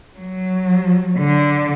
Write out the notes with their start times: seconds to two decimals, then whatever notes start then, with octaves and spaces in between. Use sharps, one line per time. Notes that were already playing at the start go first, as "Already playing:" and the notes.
0.19 F#3
1.18 D3